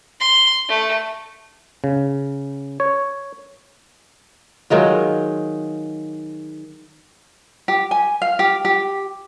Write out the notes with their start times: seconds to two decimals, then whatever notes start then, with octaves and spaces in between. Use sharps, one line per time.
0.21 C6
0.69 A3
1.84 C#3
2.80 C#5
4.70 D#3 F#3 G#3 F4
7.68 G4
7.91 G#5
8.22 F5
8.39 G4
8.65 G4